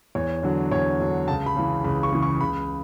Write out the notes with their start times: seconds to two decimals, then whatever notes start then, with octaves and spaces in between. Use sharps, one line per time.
0.15 E2 C#5
0.43 D3 F#3
0.71 E2 C#5
0.99 D3 F#3
1.28 C#2 A5
1.46 B5
1.56 C#3 E3
1.84 C#2 B5
2.03 C#6
2.12 C#3 E3
2.22 C#6
2.41 C#2 B5